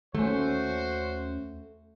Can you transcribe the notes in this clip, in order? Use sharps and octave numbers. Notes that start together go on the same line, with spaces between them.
D#2 A3 C#4 F#4 C5